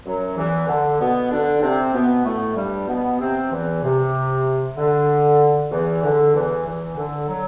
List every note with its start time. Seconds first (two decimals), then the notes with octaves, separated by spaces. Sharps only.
0.05 F#2 F#3
0.36 E2 E3
0.68 D3
0.99 B2 B3
1.31 D3 D4
1.62 C3 C4
1.93 B2 B3
2.25 A2 A3
2.56 G2 G3
2.88 B2 B3
3.19 C3 C4
3.51 E2 E3
3.83 C3
4.77 D3
5.71 E2 E3
6.03 D3
6.34 E2 E3
6.66 E2 E3
6.97 D3
7.28 F#3